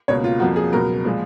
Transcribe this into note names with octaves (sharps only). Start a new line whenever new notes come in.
C#2 B2 A#3 C#5
F4
F2 F3 A#3 F#4
G#4
C#2 B2 F#3 A#4
A#2 F3 G#3